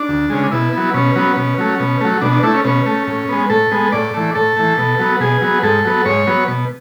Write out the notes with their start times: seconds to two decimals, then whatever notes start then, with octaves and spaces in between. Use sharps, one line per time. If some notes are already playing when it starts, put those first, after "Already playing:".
Already playing: D4
0.09 D2
0.30 C#3 G#3
0.51 B2 E4
0.73 F#3 B3
0.94 B2 C#4
1.16 F#3 B3
1.37 B2
1.58 F#3 A3
1.80 B2
2.01 F#3 A3
2.21 B2 D4
2.33 D4
2.43 A3 E4
2.54 C#4
2.65 B2 C#4
2.86 A3
3.07 A2
3.29 G#3 B3
3.50 A2 A4
3.71 G#3 B3
3.92 A2 D5
4.14 E3 A3
4.35 A2 A4
4.57 E3 A3
4.78 B2
4.99 F#3 B3
5.20 B2 G#4
5.41 F#3 B3
5.63 G#2 A4
5.85 F#3 B3
6.06 G#2 C#5
6.27 F#3 B3
6.48 B2